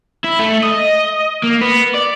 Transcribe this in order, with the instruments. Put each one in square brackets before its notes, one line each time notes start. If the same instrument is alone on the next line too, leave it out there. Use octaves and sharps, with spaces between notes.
[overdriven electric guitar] E4
A3
D#5
A#3
B3
D5